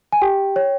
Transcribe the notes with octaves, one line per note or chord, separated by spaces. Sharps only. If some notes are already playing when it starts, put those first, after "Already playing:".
G#5
G4 G5
C#5